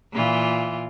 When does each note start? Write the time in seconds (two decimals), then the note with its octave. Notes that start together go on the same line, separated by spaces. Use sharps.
0.12 A#2 E3 F4